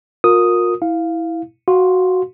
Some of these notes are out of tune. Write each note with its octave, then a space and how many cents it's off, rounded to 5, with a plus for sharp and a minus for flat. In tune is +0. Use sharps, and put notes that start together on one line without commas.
F4 +40 A#4 +0 D#6 +0
E4 -10 F5 +0
F#4 +0 F5 +15 C6 +0